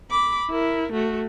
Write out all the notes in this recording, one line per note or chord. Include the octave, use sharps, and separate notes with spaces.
B5 D6
E4 A#4
A3 F#4